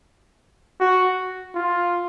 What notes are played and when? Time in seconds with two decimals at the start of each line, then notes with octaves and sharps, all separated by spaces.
0.80 F#4
1.55 F4